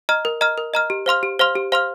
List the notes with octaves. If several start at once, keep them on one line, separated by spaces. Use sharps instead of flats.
D#5 A#5 F6
A#4
D#5 A#5 F6
A#4
D#5 A#5 F6
G4
C5 F5 C6 F6
G4
C5 F5 C6 F6
G4
C5 F5 C6 F6